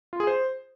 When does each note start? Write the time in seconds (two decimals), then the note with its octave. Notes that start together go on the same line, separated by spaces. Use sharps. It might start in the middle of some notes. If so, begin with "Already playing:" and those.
0.13 F4
0.20 G#4
0.27 C5